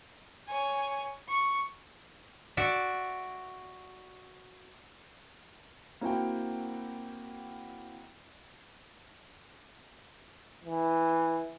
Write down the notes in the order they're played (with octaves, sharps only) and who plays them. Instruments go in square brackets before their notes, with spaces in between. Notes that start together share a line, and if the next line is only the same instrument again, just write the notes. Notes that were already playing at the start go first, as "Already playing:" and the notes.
[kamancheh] C#5 G#5
C#6
[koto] F#4 D5 E5
[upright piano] A#3 C4 E4 F#4 F#5 G5
[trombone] E3